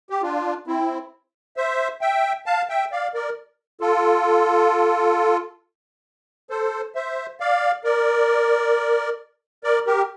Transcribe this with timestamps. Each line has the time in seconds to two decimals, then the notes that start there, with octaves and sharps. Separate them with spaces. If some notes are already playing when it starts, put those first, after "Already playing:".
0.10 G4
0.22 D4 F4
0.67 C4 E4
1.57 C5 E5
2.01 E5 G5
2.46 F5 A5
2.69 E5 G5
2.92 D5 F5
3.14 A#4 D5
3.81 F4 A4
6.50 A4 C5
6.95 C5 E5
7.40 D5 F5
7.84 A#4 D5
9.64 A#4 D5
9.86 G4 A#4